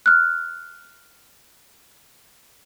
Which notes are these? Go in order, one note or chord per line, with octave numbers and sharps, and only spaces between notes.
F6 F#6